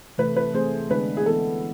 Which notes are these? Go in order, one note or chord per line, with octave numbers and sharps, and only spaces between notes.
C3 E3 A3 B4
B4
E3 A3 C4 G#4 C5
D3 G#3 B3 D4 B4
G#4
E3 B3 E4 A4